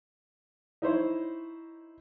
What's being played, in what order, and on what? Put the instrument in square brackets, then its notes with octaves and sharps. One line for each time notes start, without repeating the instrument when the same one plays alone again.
[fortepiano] D#4 E4 C5 C#5